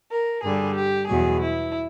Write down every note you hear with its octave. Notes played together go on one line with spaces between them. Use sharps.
A#4
G2 D3 G3 G#4
G4
E2 B2 F#3 G#4
E4